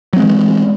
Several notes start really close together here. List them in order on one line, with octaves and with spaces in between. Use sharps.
F#3 C4 G#3 E3